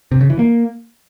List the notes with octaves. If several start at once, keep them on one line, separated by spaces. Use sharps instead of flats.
C3
C#3
E3
A#3